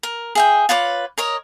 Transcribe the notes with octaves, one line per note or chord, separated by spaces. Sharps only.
A#4
G#4 E5 G5
F4 B4 C#5 D6
A#4 C#5 D#5